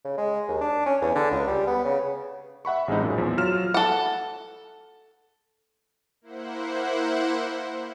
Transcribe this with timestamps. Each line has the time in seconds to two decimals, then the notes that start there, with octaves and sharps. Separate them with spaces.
0.05 C#3
0.18 G#3
0.48 D#2
0.61 D4
0.86 C#4
1.01 E2
1.15 D3
1.31 C#2
1.47 G3
1.67 B3
1.85 C#3
2.65 E5 F#5 B5 C#6
2.88 A1 G#3 C4 D#4
3.00 F#2 A#2
3.18 E2 F3
3.37 F#3 F4 F6 E7
3.74 A4 F#5
6.21 A#3 E4 C5 F#5